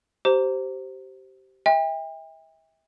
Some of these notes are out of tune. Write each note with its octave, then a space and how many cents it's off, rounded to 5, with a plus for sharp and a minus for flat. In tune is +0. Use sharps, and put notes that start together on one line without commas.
G4 -25 C5 +0 A#5 -10
E5 -35 G5 +35